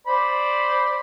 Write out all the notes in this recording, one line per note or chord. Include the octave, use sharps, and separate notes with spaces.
C5 D5 B5